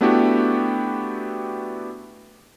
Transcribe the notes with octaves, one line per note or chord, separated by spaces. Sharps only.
A3 B3 D4 E4 F#4 G4